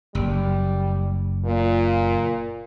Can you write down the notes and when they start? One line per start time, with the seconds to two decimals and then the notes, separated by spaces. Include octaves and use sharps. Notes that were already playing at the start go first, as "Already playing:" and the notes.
0.15 F#1 G3
1.45 A#2